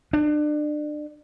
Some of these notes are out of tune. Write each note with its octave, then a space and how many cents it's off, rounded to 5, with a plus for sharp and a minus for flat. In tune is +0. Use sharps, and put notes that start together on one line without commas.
D4 +30